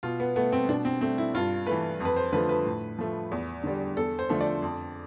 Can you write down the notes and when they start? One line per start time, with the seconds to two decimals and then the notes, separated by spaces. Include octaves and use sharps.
0.03 B2 F4
0.20 B3
0.36 A3 B3
0.52 C4
0.69 B2 D4
0.85 C4
1.01 A3 C4
1.18 E4
1.34 G2 F4
1.67 E3 A3 B4
2.00 F2 B4
2.17 C5
2.33 D3 F3 A3 B4
2.49 B4
2.65 A2
2.99 F3 A3
3.31 E2
3.64 D3 G3
3.96 E2 A4
4.19 C5
4.29 D3 F3 A3
4.41 D5
4.62 F2